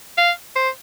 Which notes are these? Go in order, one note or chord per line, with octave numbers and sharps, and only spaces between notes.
F5
C5